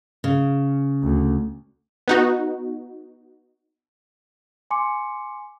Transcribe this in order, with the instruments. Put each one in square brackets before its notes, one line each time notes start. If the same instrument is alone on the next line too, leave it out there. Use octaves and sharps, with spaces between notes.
[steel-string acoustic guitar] C#3
[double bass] D2
[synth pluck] B3 D#4 F#4
[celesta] G#5 C6 D6 C#7